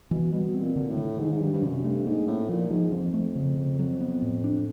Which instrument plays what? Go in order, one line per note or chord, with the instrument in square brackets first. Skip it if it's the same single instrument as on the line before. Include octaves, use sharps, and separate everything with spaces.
[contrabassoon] B2 [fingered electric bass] E3
[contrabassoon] B2 [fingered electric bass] G3
[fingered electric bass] C4
[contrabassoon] A#2
[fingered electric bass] D3
[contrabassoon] A2
[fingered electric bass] D3
[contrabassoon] G#2 [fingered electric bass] D#3
[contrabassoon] G#2
[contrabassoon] G2 [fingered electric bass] F#3
[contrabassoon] G2
[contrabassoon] F#2 [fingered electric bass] C3
[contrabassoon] G2 [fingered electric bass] A3
[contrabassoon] G#2 [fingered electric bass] A#3
[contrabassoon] A2 [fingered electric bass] C#4
[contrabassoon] A#2 [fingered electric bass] F3
[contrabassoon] G#2 [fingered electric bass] F3
[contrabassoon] F2 [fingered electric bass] F3
[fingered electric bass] A3
C#3
C#3
[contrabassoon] F2 [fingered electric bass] F#3
[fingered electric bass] B3
A2
D4